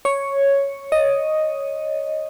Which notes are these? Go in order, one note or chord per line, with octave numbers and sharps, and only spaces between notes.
C#5
D#5